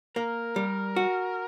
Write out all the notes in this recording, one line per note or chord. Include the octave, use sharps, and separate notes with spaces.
A#3 A#4
G3
F#4